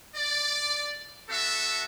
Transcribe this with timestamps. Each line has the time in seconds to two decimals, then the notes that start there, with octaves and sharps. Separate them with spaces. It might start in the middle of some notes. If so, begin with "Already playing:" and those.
0.15 D5
1.29 B3 F#4 A4 E5